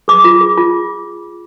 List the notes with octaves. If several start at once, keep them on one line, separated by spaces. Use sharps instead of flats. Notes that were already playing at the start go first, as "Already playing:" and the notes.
G#4 D6
F4
G#4
F4